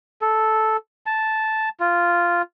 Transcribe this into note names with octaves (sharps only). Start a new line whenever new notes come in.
A4
A5
F4